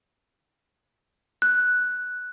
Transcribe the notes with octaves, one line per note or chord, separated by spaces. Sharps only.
F#6